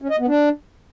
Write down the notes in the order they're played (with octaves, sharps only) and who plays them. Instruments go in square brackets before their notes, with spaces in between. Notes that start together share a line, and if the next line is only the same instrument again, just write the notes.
[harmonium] C#4
D#5
B3
D4